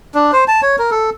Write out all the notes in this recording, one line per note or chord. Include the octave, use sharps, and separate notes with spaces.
D4
C5
A5
C#5
A#4
A4